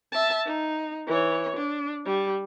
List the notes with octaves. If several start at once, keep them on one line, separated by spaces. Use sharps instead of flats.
E5 A5
D#4
E3 C#5
D4
G3